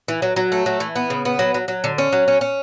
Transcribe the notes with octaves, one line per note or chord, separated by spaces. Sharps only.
E3
F#3
F#3
A3
F#3
E3
B3
C#3
B3
F#3
F#3
F#3
D3
C#4
F#3
C#4
C#4